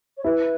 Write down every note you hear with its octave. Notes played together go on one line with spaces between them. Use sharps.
C#5
E4 B4